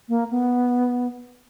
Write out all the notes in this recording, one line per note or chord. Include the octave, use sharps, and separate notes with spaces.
A#3
B3